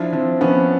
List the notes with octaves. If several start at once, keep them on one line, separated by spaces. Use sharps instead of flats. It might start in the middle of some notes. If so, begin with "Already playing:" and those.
Already playing: F3 D4 E4
F3 C4
F3 B3 C#4